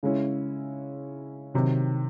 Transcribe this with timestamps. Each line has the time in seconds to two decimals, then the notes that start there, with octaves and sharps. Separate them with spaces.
0.03 C#3 G#3 C#4 E4
1.54 C3 D#3 F#3